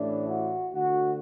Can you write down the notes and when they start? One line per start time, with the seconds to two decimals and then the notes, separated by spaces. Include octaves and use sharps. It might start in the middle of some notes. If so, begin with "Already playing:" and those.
Already playing: A1 A2 E3 D4
0.29 F#4
0.72 D2 D3 F#4